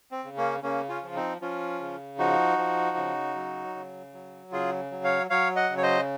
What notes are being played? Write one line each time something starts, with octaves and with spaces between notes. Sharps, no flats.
C4
C#3
A#3 C#4
C#3 A#3 C#4
C#4 F4
F3 F4
C4 D#4
F3 C#4 F4
C#3
F3 D#4 F#4
F3
C#3
F#3
C#3
F#3
C#3 F4 G#4
F#3
C#5 F5
F#3 C#5 F5
D#5 F#5
C#3
C#5
C5 D#5